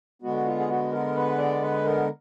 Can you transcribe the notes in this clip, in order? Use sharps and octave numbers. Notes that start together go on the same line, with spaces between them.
D3 G#3 B3 F#4
F4
G#4
F#4
A#4
B4
D5
B4
A#4